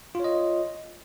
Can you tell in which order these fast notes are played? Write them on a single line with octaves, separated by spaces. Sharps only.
F4 C#5 D#5